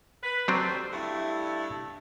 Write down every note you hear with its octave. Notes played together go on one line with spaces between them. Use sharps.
B4
D2 F#3 G3 C4 D4 C5
G2 A3 E4